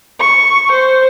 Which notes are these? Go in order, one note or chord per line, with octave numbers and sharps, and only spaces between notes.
C#6
C5